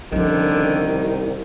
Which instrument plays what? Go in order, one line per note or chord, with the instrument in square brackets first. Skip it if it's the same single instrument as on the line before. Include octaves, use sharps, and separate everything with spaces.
[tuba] C2 [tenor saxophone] D3 [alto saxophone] D#3 [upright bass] F3 C#4